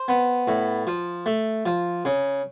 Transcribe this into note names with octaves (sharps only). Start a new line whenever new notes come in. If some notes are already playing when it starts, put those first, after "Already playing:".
Already playing: C5
B3
A2
F3
A3
F3
C#3